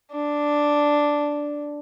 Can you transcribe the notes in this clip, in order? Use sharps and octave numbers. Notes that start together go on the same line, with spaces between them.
D4